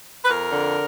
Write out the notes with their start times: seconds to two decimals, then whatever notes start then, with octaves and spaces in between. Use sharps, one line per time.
0.25 B4
0.30 F2 A#4
0.53 D3